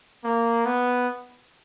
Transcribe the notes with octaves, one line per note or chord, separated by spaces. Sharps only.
A#3
B3